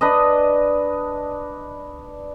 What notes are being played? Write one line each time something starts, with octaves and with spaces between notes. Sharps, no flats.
D4 B4 D#5